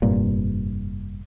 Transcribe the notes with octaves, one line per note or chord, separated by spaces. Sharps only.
F1 G2 A#2